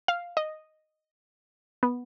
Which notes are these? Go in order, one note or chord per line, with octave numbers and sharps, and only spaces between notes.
F5
D#5
B3